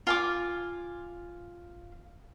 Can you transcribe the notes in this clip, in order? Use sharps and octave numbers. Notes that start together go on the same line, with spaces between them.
F4 G#5 D6